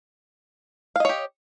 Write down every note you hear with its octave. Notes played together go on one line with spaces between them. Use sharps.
G4 C#5 D#5 F5